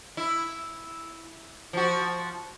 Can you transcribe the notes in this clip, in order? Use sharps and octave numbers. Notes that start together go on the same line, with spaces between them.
E4
F3 F#4